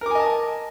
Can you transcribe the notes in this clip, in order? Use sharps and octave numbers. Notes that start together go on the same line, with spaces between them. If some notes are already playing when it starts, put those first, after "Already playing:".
A#4 D#5 G#5 A5 D6